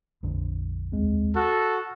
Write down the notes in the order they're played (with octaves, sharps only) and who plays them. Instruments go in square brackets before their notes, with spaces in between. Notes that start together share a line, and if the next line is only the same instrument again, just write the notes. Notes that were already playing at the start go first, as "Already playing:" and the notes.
[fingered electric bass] A#1 F2 D3
[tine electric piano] D#2 G#3 C4
[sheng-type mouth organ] F#4 [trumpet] A4 [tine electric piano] F6 F#6